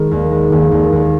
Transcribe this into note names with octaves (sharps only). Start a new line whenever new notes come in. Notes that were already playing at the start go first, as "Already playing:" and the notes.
Already playing: D#3 G#3
D#2
G#3
D#2
D#2
D#2